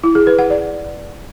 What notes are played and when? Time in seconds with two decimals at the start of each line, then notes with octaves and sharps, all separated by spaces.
0.04 E4
0.15 G#4
0.27 B4
0.39 F#5
0.50 D5